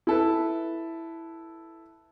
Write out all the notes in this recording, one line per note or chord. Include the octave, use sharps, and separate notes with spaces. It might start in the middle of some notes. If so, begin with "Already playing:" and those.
E4 A4 B4